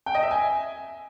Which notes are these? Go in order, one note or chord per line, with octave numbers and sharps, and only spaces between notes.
G5
D#5
E5
G#5